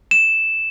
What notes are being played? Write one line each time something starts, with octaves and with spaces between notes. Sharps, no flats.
E7